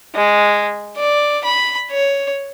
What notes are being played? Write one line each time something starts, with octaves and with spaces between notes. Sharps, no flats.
G#3
D5
B5
C#5